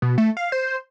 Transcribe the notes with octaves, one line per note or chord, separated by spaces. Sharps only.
B2
A3
F5
C5